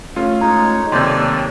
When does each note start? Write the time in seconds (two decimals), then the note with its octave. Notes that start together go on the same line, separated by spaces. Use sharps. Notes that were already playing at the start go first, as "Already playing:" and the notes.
0.16 A3 C#4 F4
0.41 G#3 D#4 C#5 A#5
0.92 D#2 C3 F#3 A4 D5 C6 G6 G#6